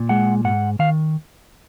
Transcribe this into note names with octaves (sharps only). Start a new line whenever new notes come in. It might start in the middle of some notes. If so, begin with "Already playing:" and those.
Already playing: A#2
G#3 F#5
G#2 F#5
D#3 F5